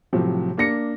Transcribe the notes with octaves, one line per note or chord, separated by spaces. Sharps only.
A2 C3 F3 F#3
A#3 D4 A#6 C#7